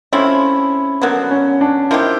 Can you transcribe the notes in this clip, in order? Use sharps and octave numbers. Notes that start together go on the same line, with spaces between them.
F3 A3 C4 C#4 E4
D3 F#3 A#3 B3
C#4
D4
F3 A#3 D#4 E4 G4